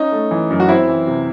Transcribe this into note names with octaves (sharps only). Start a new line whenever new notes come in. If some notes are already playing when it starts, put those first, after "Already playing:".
Already playing: C#4 D#4
A3
E3
F#2
F#4
C4 E4
E3
C3